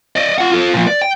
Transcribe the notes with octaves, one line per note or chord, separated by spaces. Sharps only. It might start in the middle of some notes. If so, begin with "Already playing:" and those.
D5 D#5
F4 F#5
F4 A4
A#2 F3
D5
G5